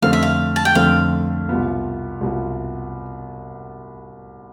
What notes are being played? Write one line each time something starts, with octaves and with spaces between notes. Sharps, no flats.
F2 D3 A3 C4 F5
E5
F5
A5
G5
F2 D3 A3 C4 F5
C2 B2 B3 F4
C2 B2 B3 F4